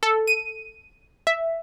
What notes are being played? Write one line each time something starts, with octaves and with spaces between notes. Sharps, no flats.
A4
D#7
E5